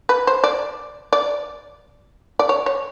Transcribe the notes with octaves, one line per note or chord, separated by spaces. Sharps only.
B4
C5
D5
D5
D5
C#5
C#5